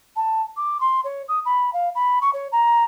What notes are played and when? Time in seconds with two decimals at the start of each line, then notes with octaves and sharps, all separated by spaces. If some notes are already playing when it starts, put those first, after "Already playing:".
0.16 A5
0.57 D6
0.81 C6
1.04 C#5
1.28 D#6
1.45 B5
1.73 F5
1.95 B5
2.21 C#6
2.33 C#5
2.52 A#5